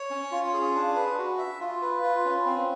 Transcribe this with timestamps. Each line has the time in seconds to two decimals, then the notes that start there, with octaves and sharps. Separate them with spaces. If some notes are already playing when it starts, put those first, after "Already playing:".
Already playing: C#5
0.10 C#4
0.31 F4
0.54 G#4
0.75 D4
0.95 B4
1.18 F#4
1.38 E5
1.61 F4
1.81 B4
2.03 F4
2.25 C#4
2.46 C4